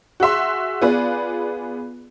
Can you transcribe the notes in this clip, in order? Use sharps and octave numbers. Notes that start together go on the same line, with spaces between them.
F#4 G#4 E5 C6
B3 F4 G#4 B4 D5